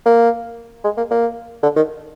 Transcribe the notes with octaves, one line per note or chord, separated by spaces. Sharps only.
A#3
G#3
A#3
A#3
D3
D#3